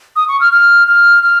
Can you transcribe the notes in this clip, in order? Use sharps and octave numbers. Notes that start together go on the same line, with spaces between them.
D#6
C#6
F6
F6
F6
F6